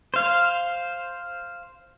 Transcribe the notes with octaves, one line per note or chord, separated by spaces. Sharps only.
C5 F5